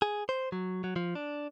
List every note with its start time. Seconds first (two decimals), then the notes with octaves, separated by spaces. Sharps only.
0.02 G#4
0.29 C5
0.52 F#3
0.84 F#3
0.96 F3
1.15 D4